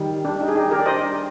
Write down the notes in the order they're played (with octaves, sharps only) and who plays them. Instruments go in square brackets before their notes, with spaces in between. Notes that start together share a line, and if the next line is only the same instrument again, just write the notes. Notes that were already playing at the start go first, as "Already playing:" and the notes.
Already playing: [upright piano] D#3 G3
[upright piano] G3 [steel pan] D4
[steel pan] D#4
G#4
[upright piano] G3 [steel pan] D#4 G4
[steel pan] G4 A#4
D5
[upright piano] D4 [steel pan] C5 D#5